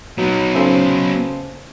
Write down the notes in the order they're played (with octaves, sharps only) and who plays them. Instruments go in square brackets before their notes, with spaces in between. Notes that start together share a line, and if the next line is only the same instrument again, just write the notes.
[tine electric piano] F#3 [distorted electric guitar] B3 D#4
[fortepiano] C#3 A4 C5